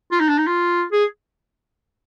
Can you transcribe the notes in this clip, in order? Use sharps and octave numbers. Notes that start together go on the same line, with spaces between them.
F4
D#4
D4
D#4
F4
G#4